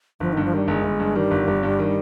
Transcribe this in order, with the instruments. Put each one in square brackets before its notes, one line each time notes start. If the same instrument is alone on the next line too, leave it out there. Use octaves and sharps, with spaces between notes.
[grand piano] G1 [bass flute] F3
[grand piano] G2 [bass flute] D#3
[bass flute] F3
[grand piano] D#3 [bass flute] G3
[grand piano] G1 [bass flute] G#3
[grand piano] G1
G2
[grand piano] D#3 [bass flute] G3
[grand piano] G1
G1
G2
D#3